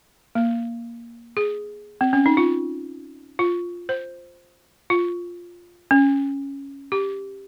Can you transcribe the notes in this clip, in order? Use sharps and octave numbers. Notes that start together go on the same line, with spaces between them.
A#3
G#4
C4
C#4
D#4
F4
F4
C5
F4
C#4
G4